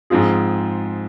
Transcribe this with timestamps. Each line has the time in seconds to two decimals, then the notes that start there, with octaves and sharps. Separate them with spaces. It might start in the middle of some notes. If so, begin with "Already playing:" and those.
0.10 G#2 F3 C4 F4 G#4